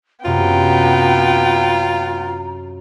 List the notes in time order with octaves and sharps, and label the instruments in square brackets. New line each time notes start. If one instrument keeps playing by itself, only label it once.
[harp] F#2 C3 [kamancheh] B3 G5 [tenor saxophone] F4 [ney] A#5